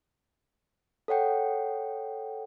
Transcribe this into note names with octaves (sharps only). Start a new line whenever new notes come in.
A4 C#5 F#5 G5